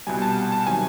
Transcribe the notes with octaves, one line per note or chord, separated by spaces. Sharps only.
C2 B2 G3 G#5
A5
A5
C3 D#3 F#3 G#5